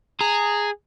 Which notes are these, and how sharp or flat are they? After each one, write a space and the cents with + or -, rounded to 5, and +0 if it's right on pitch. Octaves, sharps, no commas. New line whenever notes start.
G#4 +0 A#5 -25